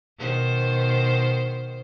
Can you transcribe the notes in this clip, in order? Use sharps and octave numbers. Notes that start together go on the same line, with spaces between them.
B2 D#3 C5